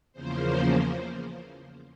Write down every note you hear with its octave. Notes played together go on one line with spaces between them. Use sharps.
E2 C#3 F3 A#3 C5